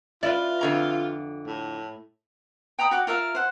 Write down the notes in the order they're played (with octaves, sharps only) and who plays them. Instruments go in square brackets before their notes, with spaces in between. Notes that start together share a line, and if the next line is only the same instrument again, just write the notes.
[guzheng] E4 B4 [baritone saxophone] F4 [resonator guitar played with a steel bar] D5
[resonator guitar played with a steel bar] F2 D3 A#5
[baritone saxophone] A2
[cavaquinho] G5 A#5 B5 D#6
F#4 G5 D6
F4 A#4 E5 F5
C5 F#5